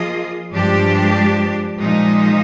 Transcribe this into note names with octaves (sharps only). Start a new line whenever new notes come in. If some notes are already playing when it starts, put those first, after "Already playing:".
Already playing: F3 A#3 F4 G#4 D#5
G2 F3 G#3 D4 G4
A#2 F3 G#3 D#4